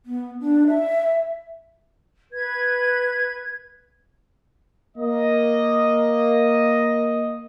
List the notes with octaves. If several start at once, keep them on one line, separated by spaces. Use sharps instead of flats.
B3
D4
E5
B4 G#6
A#3 D#5